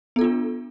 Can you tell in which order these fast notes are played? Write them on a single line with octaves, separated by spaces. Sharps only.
B3 A4 F4 D4